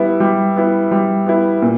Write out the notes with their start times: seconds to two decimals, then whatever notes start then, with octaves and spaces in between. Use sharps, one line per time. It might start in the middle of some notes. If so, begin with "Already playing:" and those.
Already playing: G3 B3 E4
0.20 G3
0.56 B3 E4
0.92 G3
1.26 B3 E4
1.62 A#2